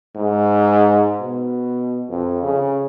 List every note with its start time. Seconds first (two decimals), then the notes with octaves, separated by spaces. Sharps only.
0.15 G#2
1.20 B2
2.09 F2
2.43 C#3